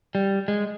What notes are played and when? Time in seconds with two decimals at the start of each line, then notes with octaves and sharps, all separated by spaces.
0.15 G3
0.48 G#3